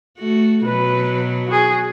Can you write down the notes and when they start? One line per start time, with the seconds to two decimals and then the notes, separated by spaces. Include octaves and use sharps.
0.18 A3 F#4
0.64 B2 F#3 B4
1.47 F#4 G#4